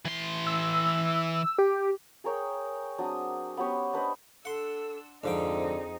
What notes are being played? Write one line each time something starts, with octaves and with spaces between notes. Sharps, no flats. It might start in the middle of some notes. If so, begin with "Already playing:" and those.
E3 C6
E6
G4
G#4 A#4 C#5 G5
F#3 C4 D4 D#6
B3 C#4 G4 C#5
D4 B4 C5 D#5
D4 A4 F#5 C6 E6
F2 G#2 D3 F3 C4 D#4 G#4 G5